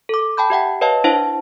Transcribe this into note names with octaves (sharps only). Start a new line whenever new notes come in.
A4 D6
G5 A5 B5 G6
G4 E5 F#5 G5
B4 C#5 D#5 F5 A5
D4 E4 C5 F5 A5